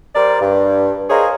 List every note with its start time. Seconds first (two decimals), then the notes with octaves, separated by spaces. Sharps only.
0.15 G3 A#4 C5 D5
0.41 G2
1.10 G#4 A#4 C5 C#5 D#5 F5